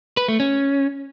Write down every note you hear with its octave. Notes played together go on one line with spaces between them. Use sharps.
B4
A3
C#4